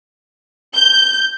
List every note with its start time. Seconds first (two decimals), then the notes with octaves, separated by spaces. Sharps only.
0.75 G6